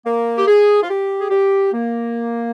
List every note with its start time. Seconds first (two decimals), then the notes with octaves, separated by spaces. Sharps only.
0.06 A#3
0.38 G4
0.47 G#4
0.83 F4
0.90 G4
1.21 G#4
1.30 G4
1.73 A#3